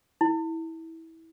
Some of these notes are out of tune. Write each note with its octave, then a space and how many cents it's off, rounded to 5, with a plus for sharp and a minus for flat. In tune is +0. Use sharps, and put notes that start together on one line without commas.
E4 -20